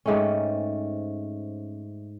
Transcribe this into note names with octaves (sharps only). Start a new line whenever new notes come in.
G#2 A3 C4 C#4